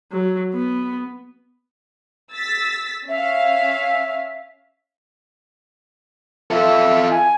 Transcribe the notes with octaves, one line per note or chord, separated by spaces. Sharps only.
F#3
B3
E6 A6 B6
C#4 E5 F5
F4 A4 E5
G#5